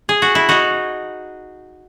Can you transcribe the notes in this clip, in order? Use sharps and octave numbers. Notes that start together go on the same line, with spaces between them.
G#4
F#4
E4
D#4 F#4